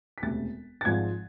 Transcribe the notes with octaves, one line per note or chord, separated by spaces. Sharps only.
B6
E1 D2 C3 G#3 A6
A6
G#1 G#2 F3 G#6